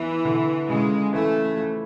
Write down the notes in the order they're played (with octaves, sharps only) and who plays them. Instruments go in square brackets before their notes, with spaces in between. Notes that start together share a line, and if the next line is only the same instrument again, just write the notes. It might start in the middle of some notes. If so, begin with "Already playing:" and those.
Already playing: [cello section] E3 [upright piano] B3
[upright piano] D3
[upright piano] C#3 [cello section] G#3
[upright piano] E3 [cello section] A3
[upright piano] F3